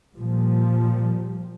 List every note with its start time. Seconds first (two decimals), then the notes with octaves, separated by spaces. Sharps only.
0.13 A#2 F3 G3